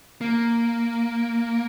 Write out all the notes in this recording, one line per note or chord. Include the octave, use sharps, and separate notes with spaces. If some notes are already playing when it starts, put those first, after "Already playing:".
A#3